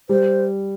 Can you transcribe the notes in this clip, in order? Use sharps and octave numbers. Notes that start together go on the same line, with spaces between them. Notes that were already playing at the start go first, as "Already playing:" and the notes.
G3 C5